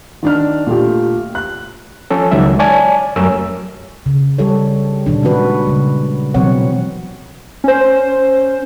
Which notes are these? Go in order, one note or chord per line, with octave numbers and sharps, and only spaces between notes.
D#3 D4 F6
A#2 A3 G4
F#6
F3 C#4 A4
C#2 D#3 F#3 G#3 E5
C#5 D5 G#5 A5
F#2 G3 A3 C#4 A#4 E6
C#3
G3 G4 A4 C#5
A#2 D#3 D4
E3 G#3 C#4 F#4 B4
C#3 G3
B2 E3 F#3 C4 C#5 F#5
C#4 C5